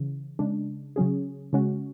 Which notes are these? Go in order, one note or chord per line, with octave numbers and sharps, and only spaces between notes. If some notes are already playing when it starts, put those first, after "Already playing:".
Already playing: C#3 E3
C#3 G#3 D4
C#3 F#3 C#4 G#4
C#3 G#3 C#4 F#4